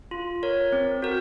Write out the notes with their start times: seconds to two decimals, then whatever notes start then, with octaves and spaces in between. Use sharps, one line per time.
0.11 F4
0.43 A#4 C#5
0.72 C4
1.02 F#4 A#4